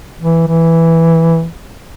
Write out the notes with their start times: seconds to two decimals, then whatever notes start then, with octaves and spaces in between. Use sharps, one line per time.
0.21 E3
0.48 E3